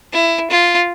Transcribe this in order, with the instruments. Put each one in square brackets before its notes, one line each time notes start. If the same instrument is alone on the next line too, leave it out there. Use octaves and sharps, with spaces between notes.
[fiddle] E4
F4